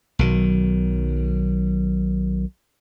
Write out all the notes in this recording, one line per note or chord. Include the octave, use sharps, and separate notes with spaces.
B1 D#3 F#3